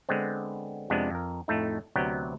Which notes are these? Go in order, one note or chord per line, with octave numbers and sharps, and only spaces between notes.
D3 G#3 B3 C4
F2 C3 G#3 B3 D4
F2 A#4
F2 A2 A3 D#4
D2 C3 F#3 B3 G5 A#5